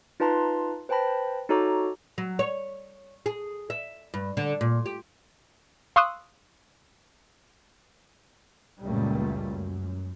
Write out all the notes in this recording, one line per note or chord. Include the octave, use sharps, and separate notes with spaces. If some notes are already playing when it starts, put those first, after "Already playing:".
D#4 F4 B4 A5 A#5 C6
B4 C5 G5 A5 B5 A#6
D#4 F#4 A4 C#5 A#5 D6
F#3
C#5
G#4
E5
G2
D3
A#2
G4
F5 C6 C#6 D#6 E6 F#6
C#2 F#2 A#2 G3 A3 A#3
F#2